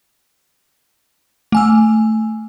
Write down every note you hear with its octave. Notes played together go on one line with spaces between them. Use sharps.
A3 G#5 E6